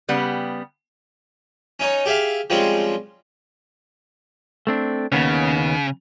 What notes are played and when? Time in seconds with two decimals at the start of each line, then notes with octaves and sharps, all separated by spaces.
0.08 C#3 G3 B3 G4
1.80 C#4 D#4 C#5
2.06 G4 G#4 E5 F5
2.50 F3 G3 G#3 C4 C#4
4.67 A3 C4 D4
5.12 D#2 C#3 B3 C#4